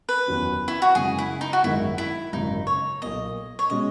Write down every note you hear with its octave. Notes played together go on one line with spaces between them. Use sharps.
B4
F#1 E2 D#3 F#3 C#4
E4
F#4
F#2 C#3 G#3 G#4
E4
D#4
F#4
G#1 F#2 D#3 G#3 E4
E4
G#1 F#2 C#3 D#4
C#5
B1 A#2 A#3 D#5
C#5
B2 G#3 C#4 D#5